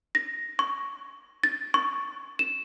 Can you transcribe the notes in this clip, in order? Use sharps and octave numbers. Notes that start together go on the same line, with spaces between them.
A#6
C#6
A6
C#6
E7